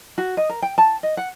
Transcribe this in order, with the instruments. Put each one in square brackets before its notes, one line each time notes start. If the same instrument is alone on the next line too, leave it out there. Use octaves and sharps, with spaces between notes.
[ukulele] F#4
D#5
A#4
G5
A5
D#5
F#5